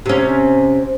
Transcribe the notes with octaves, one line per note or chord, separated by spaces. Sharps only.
C3 C#4